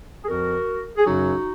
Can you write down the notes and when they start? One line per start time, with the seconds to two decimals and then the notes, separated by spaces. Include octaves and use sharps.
0.24 G#4
0.28 F2 F3 F#4 A#4
0.97 G#4
1.06 F#2 C#3 F#3 D#4 F#4